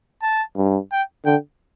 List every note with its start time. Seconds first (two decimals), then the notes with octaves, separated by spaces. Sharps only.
0.23 A5
0.57 G2
0.92 G5
1.25 D3 G5